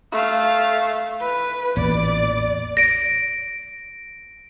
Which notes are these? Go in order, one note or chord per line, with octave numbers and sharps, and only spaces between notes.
A3 F5
B4
A1 E2 A#2 D5
A#6 D7